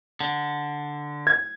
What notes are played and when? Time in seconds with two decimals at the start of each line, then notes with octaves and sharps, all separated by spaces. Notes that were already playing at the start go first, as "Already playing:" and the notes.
0.21 D3
1.27 G#6